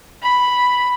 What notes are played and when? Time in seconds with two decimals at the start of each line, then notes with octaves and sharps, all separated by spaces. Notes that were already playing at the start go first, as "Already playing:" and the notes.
0.23 B5